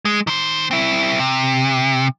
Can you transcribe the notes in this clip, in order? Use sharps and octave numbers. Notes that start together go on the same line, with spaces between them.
G#3
D#3 C5
C4 E4
C3